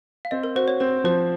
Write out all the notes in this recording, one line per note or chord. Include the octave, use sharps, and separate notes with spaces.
F5
C4 D#5
A#4
F#4 C5
C#5
C4 C5
F3 C5